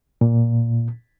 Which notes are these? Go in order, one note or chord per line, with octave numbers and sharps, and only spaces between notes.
A#2